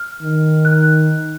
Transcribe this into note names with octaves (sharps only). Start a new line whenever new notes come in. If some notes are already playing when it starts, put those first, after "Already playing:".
Already playing: F6
D#3
F#6